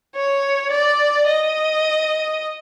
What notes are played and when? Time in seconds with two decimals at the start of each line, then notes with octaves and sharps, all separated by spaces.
0.16 C#5
0.71 D5
1.27 D#5